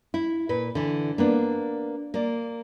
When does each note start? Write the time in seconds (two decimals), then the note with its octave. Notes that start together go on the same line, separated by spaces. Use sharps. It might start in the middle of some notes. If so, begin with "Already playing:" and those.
0.14 E4
0.49 A#2 B4
0.75 D3 E3
1.18 A#3 B3 D4
2.14 A#3 D5